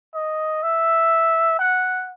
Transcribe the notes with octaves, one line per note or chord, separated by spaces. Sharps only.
D#5
E5
F#5